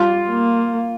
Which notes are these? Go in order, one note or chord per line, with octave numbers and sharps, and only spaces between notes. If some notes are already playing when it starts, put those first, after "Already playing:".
Already playing: G3 F4
A#3